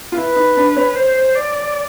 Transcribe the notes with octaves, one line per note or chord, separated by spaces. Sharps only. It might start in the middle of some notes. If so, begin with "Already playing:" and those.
F4
E4 B4
D#4
D4
C#4
C5
D5